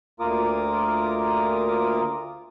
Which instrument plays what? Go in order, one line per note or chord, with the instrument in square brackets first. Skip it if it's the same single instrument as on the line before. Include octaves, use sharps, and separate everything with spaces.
[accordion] D2 A#3 F4 A#4 D6 D#6